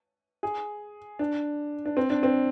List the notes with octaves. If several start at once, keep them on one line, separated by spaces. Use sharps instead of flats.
G#4
D4
D4
C4
D4
C4